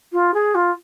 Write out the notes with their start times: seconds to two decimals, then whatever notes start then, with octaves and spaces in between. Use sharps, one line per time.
0.13 F4
0.34 G#4
0.55 F4